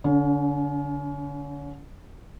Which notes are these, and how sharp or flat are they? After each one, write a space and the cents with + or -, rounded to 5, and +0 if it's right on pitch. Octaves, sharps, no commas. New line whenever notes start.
D3 -25 C#4 +35